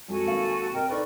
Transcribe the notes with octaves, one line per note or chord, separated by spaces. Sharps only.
F2 G#3 F#4 A4 G#5
G#1 A#3 F5
C3 A#4 D#5 G5
D#4 A4 B4 D5 D#5 C#6